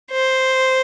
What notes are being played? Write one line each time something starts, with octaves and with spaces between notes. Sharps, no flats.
C5